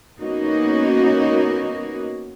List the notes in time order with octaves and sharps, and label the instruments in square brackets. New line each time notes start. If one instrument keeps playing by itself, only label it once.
[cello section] A#3 B3 C#4 D#4 F#4